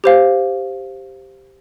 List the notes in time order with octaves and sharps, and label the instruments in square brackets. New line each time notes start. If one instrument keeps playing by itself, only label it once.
[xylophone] G4 C5 F5